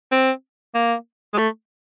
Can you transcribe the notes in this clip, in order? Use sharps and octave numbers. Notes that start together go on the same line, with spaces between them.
C4
A#3
G#3
A3